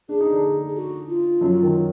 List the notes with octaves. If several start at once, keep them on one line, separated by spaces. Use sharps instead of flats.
D4 G#4
D#4
D3 D4
G#4
F#4
F4
F#2 F#3
D#3